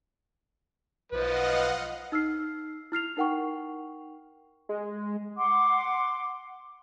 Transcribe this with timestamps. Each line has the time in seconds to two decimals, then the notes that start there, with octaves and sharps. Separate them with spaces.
1.12 B1 F3 B4 D#5 F5 F#5
2.12 D#4 E6 F6 C7
2.92 E4 F6 C7 F7
3.17 D#4 A#4 F#5 G5 C#6
4.69 G#3
5.36 F#5 C6 D6